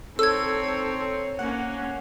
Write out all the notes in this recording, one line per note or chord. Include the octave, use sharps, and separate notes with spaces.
C4 D#4 A4 C#5 E6 G#6
A#3 C#4 F#5